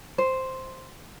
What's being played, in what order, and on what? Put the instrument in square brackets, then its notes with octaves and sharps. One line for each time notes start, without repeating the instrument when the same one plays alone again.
[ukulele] C5